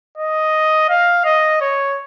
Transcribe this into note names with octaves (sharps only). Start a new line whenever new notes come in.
D#5
F5
D#5
C#5